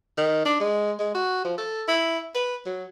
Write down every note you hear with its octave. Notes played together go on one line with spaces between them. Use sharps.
D#3
D4
G#3
G#3
F#4
F3
A4
E4
B4
F#3